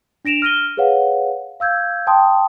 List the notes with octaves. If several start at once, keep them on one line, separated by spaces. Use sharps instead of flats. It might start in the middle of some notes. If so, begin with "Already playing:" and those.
D4 A#6 D7 E7 F7
F6 A#6 D#7 G7
G#4 B4 C#5 F5 F#5
F5 E6 G6 G#6
G5 A5 C6 D#6